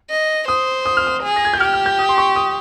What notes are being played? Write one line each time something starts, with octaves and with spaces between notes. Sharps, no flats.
D#5
C5 D#6
D#6
F6
D#6
G#4
A#6
G#6
G6
G4 F6
F6
G6
D#6
C6
C#6
D#6